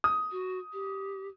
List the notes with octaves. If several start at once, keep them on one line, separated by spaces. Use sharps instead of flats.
D#6
F#4
G4